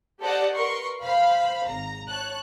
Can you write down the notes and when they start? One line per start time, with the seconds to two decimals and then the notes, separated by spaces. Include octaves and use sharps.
0.21 G4 A4 C5 D5 D#5 F#5
0.54 A#4 B4 C6 C#6
1.02 C5 F5 B5
1.66 G#1 A#5
2.09 C#5 A5 F#6